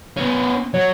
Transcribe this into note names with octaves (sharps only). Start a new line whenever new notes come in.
B3 C#4
F#3 C#5